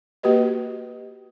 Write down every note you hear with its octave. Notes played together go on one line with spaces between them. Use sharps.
A#3 F#4 G4 B4 D#5